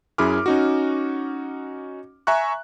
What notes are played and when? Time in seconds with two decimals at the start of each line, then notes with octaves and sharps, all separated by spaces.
0.18 F#2 E4 G#4 B5 D6 F6
0.46 C#4 D#4 F#4
2.27 E5 G#5 A#5 C#6 F#6